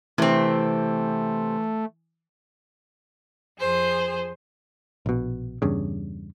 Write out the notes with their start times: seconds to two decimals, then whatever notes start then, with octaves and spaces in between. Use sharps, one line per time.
0.18 C3 E3 A3 C4
3.59 F2 G#4 C5
5.06 A#1 B2
5.62 E2 G2 C#3